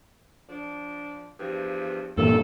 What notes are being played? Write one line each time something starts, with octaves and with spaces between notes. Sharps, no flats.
F3 D4
E2 G2 F3
G2 A#2 E3 A4